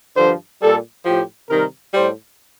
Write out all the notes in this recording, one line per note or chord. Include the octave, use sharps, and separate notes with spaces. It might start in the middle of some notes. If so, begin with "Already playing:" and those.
G2 D3 F3 C5
A#2 G3 A4
A2 F3 G4
C3 D#3 G3 A#4
A2 G3 C5